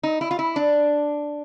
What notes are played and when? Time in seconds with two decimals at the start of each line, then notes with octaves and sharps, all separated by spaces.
0.03 D#4
0.21 E4
0.31 F4
0.39 E4
0.56 D4